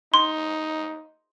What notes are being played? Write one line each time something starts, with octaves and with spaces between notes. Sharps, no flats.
D#4 C6